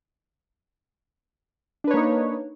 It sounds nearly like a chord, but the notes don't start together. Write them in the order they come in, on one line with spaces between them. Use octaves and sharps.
D4 B4 C#5 A#3 D#4